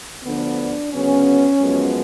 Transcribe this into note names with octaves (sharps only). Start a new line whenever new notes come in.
D2 D3 F3 B3 D4
D2 C#3 F#3 B3 C#4
F#2 F3 G#3 B3